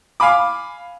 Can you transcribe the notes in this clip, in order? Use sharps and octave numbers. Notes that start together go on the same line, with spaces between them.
F5 G#5 B5 D6